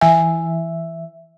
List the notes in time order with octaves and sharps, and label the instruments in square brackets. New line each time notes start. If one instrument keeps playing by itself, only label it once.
[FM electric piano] E3 E5 [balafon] G#5